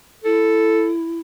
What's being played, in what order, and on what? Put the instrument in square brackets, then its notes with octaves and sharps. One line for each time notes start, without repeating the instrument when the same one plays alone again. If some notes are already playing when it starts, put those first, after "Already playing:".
[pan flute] E4 [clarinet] A4